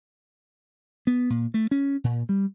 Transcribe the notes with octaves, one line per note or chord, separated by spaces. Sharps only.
B3
A#2
A3
C#4
A#2
G3